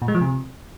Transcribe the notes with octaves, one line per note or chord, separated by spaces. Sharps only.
A#2
G#3
F3
C3